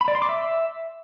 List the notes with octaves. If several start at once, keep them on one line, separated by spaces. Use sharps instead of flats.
B5
D5
C6
D6
E5